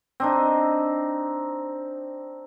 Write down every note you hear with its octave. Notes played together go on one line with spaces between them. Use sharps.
C4 D4 D#4